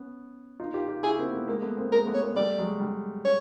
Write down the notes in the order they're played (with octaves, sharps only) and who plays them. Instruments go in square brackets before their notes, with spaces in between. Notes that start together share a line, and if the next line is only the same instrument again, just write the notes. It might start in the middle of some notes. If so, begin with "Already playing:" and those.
Already playing: [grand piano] B3 C#4
D#4 F4
F4 G4
F4 G4
[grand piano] E4 F#4 [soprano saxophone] G#4
[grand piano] A#3 C4
A3 B3
G#3 A#3
A3 B3
A#3 C4
[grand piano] G#3 A#3 [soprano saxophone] A#4
[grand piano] A3 B3
[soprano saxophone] C#5
[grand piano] G#3 A#3
[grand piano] G3 A3 [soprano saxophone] D5
[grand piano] F#3 G#3
G3
[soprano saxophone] C#5